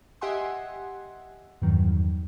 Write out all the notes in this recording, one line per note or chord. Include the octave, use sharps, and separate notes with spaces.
G4 D#5 E5 F#5 G#5 C6
E2 G2 D#3 F#3